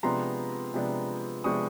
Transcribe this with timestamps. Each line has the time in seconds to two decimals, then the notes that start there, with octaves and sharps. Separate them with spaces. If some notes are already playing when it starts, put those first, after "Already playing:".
0.03 C3 F3 G#3 B3 D4 A#5 C6
0.74 C3 F3 G#3 B3 D4
1.44 C3 F3 G#3 B3 D4 C#6 D#6